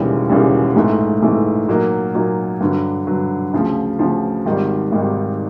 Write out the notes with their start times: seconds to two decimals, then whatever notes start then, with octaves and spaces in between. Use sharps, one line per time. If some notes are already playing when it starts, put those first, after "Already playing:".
Already playing: E1 D#2 C#3 E3 G3
0.29 E1 D#2 C#3 E3 G3
0.76 A#1 G#2 E3 A3
1.22 A#1 G#2 E3 A3
1.68 A#2 F#3 A#3 D#4
2.14 A#2 F#3 A#3 D#4
2.61 G2 D3 F#3
3.07 G2 D3 F#3
3.53 D2 C#3 F3
3.99 D2 C#3 F3
4.46 G#1 G#2 D#3 G3
4.92 G#1 G#2 D#3 G3